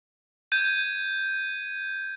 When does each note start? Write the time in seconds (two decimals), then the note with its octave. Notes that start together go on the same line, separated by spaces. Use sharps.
0.52 G6 G#6 D#7